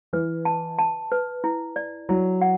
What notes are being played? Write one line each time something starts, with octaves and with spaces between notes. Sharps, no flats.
E3 B4
A5
A5
B4
E4
D5
F#3 E4
F#5